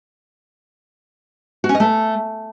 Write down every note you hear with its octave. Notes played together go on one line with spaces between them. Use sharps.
F#4
C#4
D#5
A3